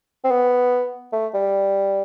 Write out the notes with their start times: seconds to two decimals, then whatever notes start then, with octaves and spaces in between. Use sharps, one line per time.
0.24 C4
0.31 B3
1.13 A3
1.34 G3